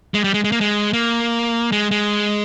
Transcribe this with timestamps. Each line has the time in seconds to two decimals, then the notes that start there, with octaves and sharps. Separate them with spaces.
0.14 G#3
0.24 G3
0.34 G#3
0.44 G#3
0.52 A#3
0.61 G#3
0.93 A#3
1.72 G#3
1.91 G#3